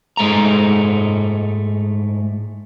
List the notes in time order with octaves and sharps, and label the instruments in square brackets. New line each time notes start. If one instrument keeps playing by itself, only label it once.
[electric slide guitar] G#2 G#3 A3 A#5